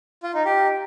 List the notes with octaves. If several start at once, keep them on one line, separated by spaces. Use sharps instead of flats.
F4
D#4
G4